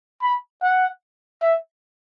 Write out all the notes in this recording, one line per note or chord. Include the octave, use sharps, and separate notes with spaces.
B5
F#5
E5